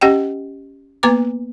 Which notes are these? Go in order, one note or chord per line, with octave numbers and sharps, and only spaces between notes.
C#4 G4 D#5 F#5 G5
A#3 B3 B4 A#5 D6